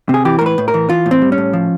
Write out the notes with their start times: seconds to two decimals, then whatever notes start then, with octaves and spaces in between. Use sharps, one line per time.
0.09 C3 G#4
0.25 E3 G4
0.39 A#4
0.41 A2 B4
0.58 A2
0.68 A#4
0.74 E3
0.89 E3 F4
1.06 A2
1.11 C4
1.22 G3
1.32 C#4
1.38 A2
1.53 F3